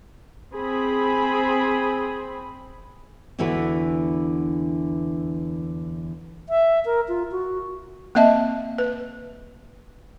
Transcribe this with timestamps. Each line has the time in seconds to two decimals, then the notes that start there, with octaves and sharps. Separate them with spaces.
0.52 C4 G#4 B5
3.39 E2 D3 E3 E4 F#4 B4
6.49 E5
6.85 A#4
7.08 F4
7.31 F#4
8.15 A#3 C4 D#5 E5 A5
8.78 B4